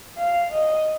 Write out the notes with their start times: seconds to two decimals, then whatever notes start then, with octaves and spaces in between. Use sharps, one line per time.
0.18 F5
0.52 D#5